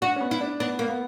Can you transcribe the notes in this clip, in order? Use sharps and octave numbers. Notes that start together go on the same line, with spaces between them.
D4 F#4
C#4
B3
E4
D4
B3 D4
A#3
B3